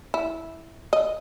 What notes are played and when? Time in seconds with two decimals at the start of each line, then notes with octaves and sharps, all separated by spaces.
0.14 E4
0.93 D#5